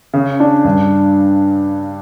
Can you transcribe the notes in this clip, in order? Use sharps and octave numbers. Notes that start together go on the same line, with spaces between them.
C#3
D4
G2